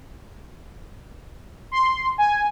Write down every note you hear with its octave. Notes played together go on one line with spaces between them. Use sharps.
C6
G#5